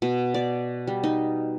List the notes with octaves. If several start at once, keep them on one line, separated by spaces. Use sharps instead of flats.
B2
D5
G3
D#4